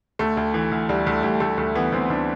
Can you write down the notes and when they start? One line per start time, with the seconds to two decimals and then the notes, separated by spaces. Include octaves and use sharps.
0.19 D2 A3
0.37 D2
0.54 E3
0.72 D2
0.89 D2 G3
1.06 D2 A3
1.23 D2 G3
1.40 D2 A3
1.57 D2 A3
1.75 E3 B3
1.92 D2 C4
2.10 D2 D4